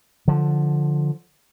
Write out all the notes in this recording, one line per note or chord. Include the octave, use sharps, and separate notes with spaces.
D3 F3